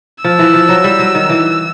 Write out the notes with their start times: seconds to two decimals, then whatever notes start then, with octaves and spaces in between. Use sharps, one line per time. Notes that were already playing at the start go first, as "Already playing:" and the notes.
0.24 F3 E6
0.39 E3
0.54 F3
0.69 F#3
0.84 G3
0.99 F#3
1.14 D#3
1.29 E3